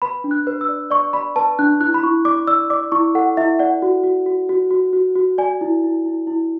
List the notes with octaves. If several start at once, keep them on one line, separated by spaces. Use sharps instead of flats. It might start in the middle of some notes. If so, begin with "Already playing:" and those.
B4 B5
D4
F#6
B4
E6
D5
D5 C#6
D5 B5
B4 A5
D4 F#6
E4 F#6
B5
E4 C#6
D5 D6
D5 E6
D5 D6
E4 C#6
A4 F#5
E4 E5
D5 F#5
F#4
F#4
F#4
F#4
F#4
F#4
F#4
D5 G#5
E4
E4
E4
E4